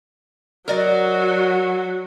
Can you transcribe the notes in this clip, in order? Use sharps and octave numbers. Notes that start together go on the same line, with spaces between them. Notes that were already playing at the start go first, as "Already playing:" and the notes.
F#3 F#4 A#4 D5 D#5